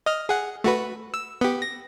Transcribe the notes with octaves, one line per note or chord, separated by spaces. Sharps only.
D#5 F6
G#4 F#5
A3 F#4 B4
E6
B3 G4
A#6